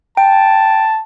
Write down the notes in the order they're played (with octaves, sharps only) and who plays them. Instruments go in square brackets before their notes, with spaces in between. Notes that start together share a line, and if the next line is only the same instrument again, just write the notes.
[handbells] G5 [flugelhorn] A5